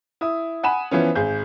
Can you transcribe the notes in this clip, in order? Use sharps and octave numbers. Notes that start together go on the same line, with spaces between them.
E4 D#6
F#5 G#5 B5 E7
E3 F3 B3 C#4
G#1 G#4 G6